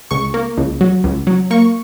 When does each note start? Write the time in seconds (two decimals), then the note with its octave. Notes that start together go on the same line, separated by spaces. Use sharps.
0.11 C#2 C#6
0.34 A#3
0.57 C#2
0.81 F#3
1.04 C#2
1.27 F#3
1.51 A#3 C#6